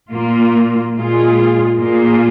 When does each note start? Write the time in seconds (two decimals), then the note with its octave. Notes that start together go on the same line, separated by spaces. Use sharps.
0.11 A#2 A#3 F4
0.95 A#2 G#3 F4 G#4
1.79 A#2 A#3 F4 G#4